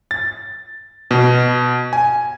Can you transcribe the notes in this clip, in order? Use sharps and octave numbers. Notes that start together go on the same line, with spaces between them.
A6
B2
G#5